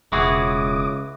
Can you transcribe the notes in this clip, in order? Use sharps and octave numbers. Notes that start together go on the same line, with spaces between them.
E1 C#2 E4 F#4 G#4 D6 D#6